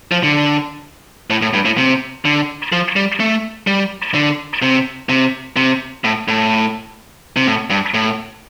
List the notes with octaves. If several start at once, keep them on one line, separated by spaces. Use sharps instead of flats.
F3
D3
A2
A2
G2
A2
C3
D3
F3
G3
A3
G3
D3
C3
C3
C3
A2
A2
C3
A2
G2
A2